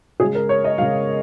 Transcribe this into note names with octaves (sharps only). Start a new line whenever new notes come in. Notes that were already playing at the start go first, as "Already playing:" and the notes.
C#3 G#3 G#4
A#4
C#5
D#5
C#3 G#3 F5